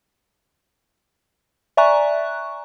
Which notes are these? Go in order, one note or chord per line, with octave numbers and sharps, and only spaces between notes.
D5 E5 G#5 A#5 C#6 F#6